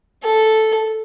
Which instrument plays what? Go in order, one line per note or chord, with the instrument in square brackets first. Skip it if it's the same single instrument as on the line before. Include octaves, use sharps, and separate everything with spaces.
[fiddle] A4